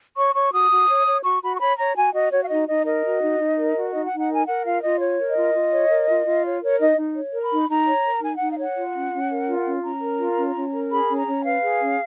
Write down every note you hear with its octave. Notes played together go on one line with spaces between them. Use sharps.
C#5 C#6
C#5 C#6
F#4 D#6
F#4
C#5
C#5
F#4 C#6
F#4 B5
C#6
C#5 B5
C#5 A#5
F#4 G#5
F#4 D#5
F#4 C#5
F5
D#4 D#5
D#4 D#5
A#4 D#5
F#4
D#4
D#4
A#4
F#4
D#4 D#5
F#5
D#4
F#5
A#4 G#5
A#4 F#5
F4 F5
F4 D#5
C#5
A#4
D#5
F4
F4
C#5
A#4
F4
F4
C#5
A#4 C#5
D#4 D#5
D#4
C#5
A#4
B5
D#4
D#4 A#5
C#5
A#4
D#4 G#5
D#4 F#5
F5
C#5 F#5
F4
C#4
C#4
A#4
F4
C#4
C#4 A#5
A#4
F4
C#4
C#4
A#4
G#4 B5
C#4
A#5
C#4
B4 F5
G#4
C#4